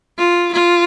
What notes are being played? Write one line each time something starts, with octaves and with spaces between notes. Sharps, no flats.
F4
F4